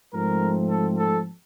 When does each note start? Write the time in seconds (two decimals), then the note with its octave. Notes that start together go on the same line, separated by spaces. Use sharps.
0.12 G#2 F3 A3 C4 A#4
0.69 A4
0.98 A4